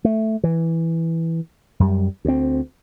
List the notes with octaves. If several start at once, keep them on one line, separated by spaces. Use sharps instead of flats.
A3
E3
F#2 G3
D2 C4